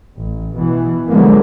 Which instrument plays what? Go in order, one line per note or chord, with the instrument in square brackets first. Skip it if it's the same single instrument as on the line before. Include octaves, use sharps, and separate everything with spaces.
[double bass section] A1
B2 E3
D3 F3 F#3 G#3 A#3 B3